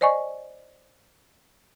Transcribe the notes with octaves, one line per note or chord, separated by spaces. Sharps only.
C5 D5 D#5 G#5 C#6